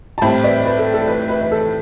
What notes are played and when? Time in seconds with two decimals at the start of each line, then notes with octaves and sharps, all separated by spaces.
0.18 A5
0.22 A2 G3 C4 E4 G5 B5
0.44 B4 D5
0.65 B4
0.79 A4
0.94 A4
1.08 B4
1.29 B4
1.41 B4
1.52 A4